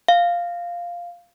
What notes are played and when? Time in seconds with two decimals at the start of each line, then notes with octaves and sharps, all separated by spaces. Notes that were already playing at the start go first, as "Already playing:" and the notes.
0.08 F5